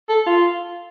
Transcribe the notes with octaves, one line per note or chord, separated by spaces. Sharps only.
A4
F4